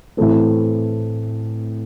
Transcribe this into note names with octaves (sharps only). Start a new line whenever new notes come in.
A2 E3 A3 C4